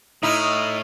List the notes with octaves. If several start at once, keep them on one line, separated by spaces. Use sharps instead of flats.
A2 D#4 E4 D#5 D#6 F6